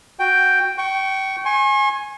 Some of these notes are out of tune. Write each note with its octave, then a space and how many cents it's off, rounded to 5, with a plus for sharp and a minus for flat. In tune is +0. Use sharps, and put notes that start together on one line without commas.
F#4 +0 G5 +0
G5 -25 C#6 +0
G#5 +0 C#6 -45